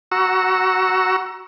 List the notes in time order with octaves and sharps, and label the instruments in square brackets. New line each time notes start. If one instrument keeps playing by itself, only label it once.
[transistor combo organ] F#4 A#5 C#6 E6